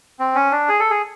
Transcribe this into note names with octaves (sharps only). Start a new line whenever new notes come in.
C4
C#4
D4
G#4
A4
G#4